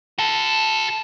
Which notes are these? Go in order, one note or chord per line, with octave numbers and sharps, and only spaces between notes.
F#4 A4